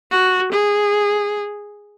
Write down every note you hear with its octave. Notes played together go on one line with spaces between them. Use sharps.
F#4
G#4